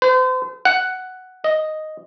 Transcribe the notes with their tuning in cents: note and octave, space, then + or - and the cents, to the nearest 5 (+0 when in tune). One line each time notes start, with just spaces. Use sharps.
C5 -40
F#5 +5
D#5 +0